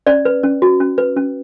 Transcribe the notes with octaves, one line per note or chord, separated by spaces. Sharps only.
C#4 D5
B4
C#4
F#4
C#4
B4
C#4